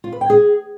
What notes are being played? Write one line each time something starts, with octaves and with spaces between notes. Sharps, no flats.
F4
B4
G5
G#4